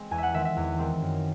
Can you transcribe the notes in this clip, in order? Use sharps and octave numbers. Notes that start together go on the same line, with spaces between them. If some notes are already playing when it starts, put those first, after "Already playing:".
Already playing: G#3 C4
E2 G#5
E5 F#5
D#3 G#3 C4 E5
E5
E2
D#3 G#3 C4
F#2